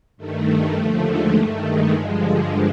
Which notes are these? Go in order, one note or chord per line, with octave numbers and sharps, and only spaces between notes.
G2 D#3 A3
D#2 D3 F3
G#3
G2 D#3 A3
G#3
G2 D3 F3 G#3